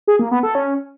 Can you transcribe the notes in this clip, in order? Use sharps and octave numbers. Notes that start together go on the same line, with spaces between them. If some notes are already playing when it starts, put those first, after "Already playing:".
G#4
A#3
B3
A4
C#4